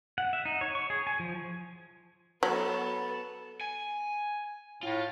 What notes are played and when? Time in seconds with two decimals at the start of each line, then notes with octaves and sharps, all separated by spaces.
0.18 F#5
0.33 E5
0.45 D#4
0.61 C#5
0.75 C#6
0.90 G#4
1.07 G#5
1.19 F3
2.43 F#3 B3 A4
3.61 G#5
4.83 A2 F4